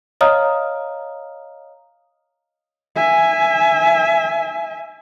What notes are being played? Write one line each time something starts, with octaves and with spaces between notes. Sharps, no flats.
C#5 D#5 F5 A#5 D#6 F6
E5 G#5